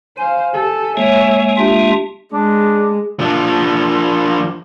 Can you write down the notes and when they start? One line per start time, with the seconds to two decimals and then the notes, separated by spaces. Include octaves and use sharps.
0.18 C5 F5 G#5
0.53 G4 A4
0.97 G#3 A#3 C#5 E5
1.57 D4 F4 G4 E5
2.34 G#3 D4
3.19 F3 D4